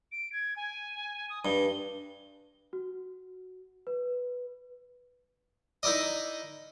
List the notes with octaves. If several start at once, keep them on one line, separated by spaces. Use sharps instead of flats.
D7
G#6
G#5
D#6
G2 G7
F#4
B4
D#4 E4 A#4 D5 D#5